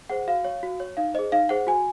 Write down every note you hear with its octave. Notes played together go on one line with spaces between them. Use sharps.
G#4 C5 F#5
F#4 F5
C#5
F#4
C#5
D#4 F5
G#4 C5 D#5
D#4 F5
G#4 C5 F#5
F#4 G#5